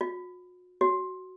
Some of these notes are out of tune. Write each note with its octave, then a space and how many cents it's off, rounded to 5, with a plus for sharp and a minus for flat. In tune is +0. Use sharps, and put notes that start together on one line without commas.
F#4 -40
F#4 +10